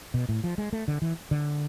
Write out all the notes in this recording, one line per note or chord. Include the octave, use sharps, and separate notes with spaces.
B2
A2
F3
G#3
A3
D3
E3
D3